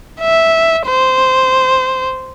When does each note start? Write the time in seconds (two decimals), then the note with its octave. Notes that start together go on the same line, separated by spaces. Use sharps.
0.21 E5
0.87 C5